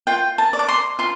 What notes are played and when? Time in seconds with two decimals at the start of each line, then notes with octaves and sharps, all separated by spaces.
0.07 F4 G5
0.38 A5
0.53 D5
0.59 D6
0.68 C6
0.99 F4 C6